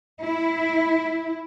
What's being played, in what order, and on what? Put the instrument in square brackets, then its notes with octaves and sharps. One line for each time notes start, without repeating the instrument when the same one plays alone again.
[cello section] E4